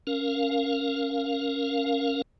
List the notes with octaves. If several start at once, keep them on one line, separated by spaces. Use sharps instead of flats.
C#4 A#4 F5